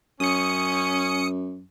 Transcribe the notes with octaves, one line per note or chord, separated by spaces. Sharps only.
F#2 C#4 D#6 C#7